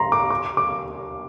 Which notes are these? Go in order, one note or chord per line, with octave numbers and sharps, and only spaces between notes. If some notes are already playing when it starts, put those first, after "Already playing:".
Already playing: A#5 C6
D6
D6
D6